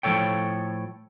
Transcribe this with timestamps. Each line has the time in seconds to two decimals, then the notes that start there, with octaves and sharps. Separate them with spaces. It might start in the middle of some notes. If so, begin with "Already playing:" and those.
0.03 A2 F3 G#3 A4 C#5 G5